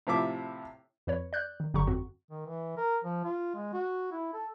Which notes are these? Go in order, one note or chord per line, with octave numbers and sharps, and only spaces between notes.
A2 C3 F3 E5 D6
F2 B4 C#5
D5 F#6 G6
D#3
G1 D3 F#3 G4 A#5 C#6
F2 C4 F#4
D#3
E3
A#4
F3
F4
G#3
F#4
E4
A4